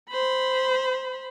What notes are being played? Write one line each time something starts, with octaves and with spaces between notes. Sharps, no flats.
C5 B5